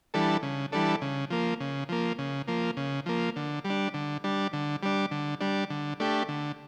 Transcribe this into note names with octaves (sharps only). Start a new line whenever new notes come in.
E3 G3 D4 A4
C#3
E3 G3 D4 A4
C#3
F3 A#3
C#3
F3 A#3
C#3
F3 A#3
C#3
F3 A#3
D3
G3
D4
D3
G3 D4
D3
G3 D4
D3
G3 D4
D3
A3 D4 G4
D3